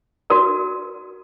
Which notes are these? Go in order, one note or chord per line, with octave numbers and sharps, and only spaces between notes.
F#4 A#4 D5